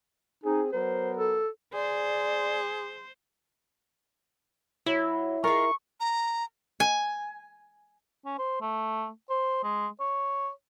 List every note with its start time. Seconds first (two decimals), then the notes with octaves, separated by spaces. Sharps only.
0.44 C4 D#4 G#4
0.73 F#3 B3 A#4 C5
1.17 A4
1.74 G#4 C5 D5
4.86 F#3 E4
5.44 G#3 F4 A#4 C#6
6.00 A#5
6.80 G#5
8.26 C#4
8.39 C5
8.61 A3
9.30 C5
9.63 G#3
10.00 C#5